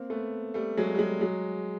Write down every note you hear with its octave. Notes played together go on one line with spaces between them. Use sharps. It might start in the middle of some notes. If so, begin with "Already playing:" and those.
Already playing: A#3 C4
A3 B3
G3 A3
F#3 G#3
G3
F#3 G#3
F#3 G#3